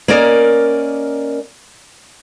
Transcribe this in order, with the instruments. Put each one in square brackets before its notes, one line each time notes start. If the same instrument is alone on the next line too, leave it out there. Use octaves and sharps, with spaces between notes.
[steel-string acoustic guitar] A#3 C#4 A#4 D5 D#5